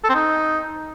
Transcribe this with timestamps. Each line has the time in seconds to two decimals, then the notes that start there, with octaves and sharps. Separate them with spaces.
0.04 A4
0.09 C4
0.15 D#4